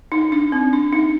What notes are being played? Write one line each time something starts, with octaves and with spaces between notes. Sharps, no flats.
D#4
D4
C4
D4
D#4